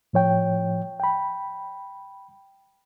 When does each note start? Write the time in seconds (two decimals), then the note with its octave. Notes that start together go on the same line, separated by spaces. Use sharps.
0.13 A2 F3 C#5 G5
1.00 G5 B5